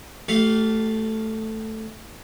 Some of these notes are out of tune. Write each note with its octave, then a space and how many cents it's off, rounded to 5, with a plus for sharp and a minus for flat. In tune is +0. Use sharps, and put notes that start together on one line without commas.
A3 +0 G4 -35 F5 +0